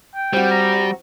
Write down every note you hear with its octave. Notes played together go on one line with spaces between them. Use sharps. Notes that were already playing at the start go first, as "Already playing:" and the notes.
G5
G3 C4 F#4
A#5